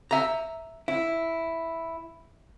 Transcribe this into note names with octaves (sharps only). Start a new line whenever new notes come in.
E5 A#5
E4